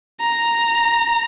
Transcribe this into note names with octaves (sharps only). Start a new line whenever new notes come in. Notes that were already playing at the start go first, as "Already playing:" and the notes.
A#5